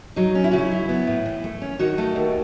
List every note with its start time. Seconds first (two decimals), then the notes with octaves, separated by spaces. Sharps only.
0.16 F#3 D#4
0.35 C#4
0.44 E4
0.51 C#3 F#4
0.58 E4
0.71 F#3
0.89 B3
1.07 A2
1.26 E3
1.44 A3
1.62 C#4
1.79 D#3 D#4 F#4
1.98 A3
2.16 D#2